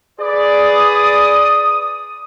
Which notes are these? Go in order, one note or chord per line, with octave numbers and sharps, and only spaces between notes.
G#4 B4 D5 D#6